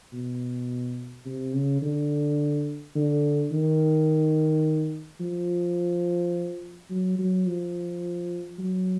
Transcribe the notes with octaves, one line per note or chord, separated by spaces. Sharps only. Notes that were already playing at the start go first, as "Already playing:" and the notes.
B2
C3
C#3
D3
D3
D#3
F3
F#3
F#3
F3
F#3